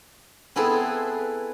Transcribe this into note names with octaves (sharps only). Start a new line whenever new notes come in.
B3 C4 E4 G#4 A4 B4